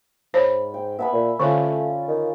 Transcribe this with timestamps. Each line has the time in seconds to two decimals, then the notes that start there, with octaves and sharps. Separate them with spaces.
0.34 G#2 C5 C#5 B5
0.74 G5
0.99 B3 E5 G#5 B5
1.13 A#2
1.39 D3 A3 C#4 F4 A4 D5
2.08 D#3